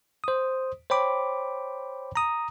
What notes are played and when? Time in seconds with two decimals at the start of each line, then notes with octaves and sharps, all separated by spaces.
0.24 C5 D#6
0.90 C5 C#5 G5 B5 D6
2.16 A#5 D#6